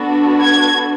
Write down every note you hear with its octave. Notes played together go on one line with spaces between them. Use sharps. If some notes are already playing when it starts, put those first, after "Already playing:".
Already playing: B3 D4 F#4 A4
G#6